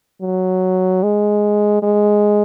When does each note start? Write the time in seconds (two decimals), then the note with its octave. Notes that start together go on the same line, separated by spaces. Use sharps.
0.21 F#3
1.03 G#3
1.83 G#3